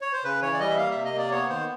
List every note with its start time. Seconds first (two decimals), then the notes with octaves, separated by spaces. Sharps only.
0.01 C#5
0.13 C5
0.24 C#3 B4
0.42 E3 C#5
0.54 D5
0.60 G3 D#5
0.70 E5
0.78 A#3 F5
0.91 C3 E5
1.05 D#5
1.13 A#3 D5
1.31 B3 C#5
1.49 D#3 C5